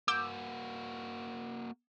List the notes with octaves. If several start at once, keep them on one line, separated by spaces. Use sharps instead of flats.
A#3 F#4 D6 E6 G6